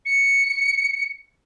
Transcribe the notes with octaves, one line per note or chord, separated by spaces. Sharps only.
C#7